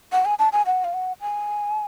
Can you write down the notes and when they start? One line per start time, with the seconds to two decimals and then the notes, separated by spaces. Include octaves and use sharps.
0.12 F#5
0.25 G#5
0.39 A5
0.53 G#5
0.66 F#5
0.85 F5
0.94 F#5
1.21 G#5